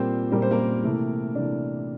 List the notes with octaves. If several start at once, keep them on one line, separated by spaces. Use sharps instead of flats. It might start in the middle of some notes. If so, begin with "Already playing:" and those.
Already playing: A#2 G3 A#3 C4 C5
A#2 G3 A#3 A#4
C5
A#3 A#4
C3 E3 A3
C3 E3 A3 D4